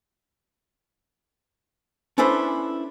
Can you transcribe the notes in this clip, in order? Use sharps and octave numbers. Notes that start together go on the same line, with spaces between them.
C#4 D4 E4 A4 B4 C5